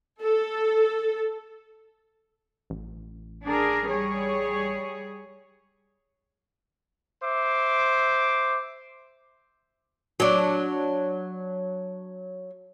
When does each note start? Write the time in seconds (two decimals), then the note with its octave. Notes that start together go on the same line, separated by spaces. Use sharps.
0.22 A4
2.70 A1
3.45 D4 G#4 A#4
3.87 G3 G#4 C#5
7.23 C5 E5 D6
10.20 F#3 D4